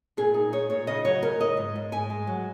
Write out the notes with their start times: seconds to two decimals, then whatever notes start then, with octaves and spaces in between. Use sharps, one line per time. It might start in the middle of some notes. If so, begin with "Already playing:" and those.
0.17 A#2 G#4
0.34 D#4
0.52 D#4 C#5
0.70 A#2 C#5
0.87 C#3 D#5
1.05 F#3 C#5
1.22 C#3 A#4
1.40 D#4 D#5
1.57 G#2
1.76 G#2
1.92 G#2 G#5
2.10 G#3
2.27 F#3